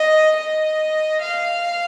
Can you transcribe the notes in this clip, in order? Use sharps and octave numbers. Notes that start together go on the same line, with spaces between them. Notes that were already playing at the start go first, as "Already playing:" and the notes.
Already playing: D#5
D#5
F5